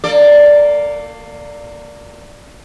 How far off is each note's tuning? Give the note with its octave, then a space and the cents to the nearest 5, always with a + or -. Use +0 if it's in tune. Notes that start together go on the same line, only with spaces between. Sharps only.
A#3 +0 A4 +40 D5 +0